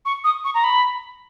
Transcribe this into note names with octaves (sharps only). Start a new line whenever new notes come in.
C#6
D#6
C#6
A#5
B5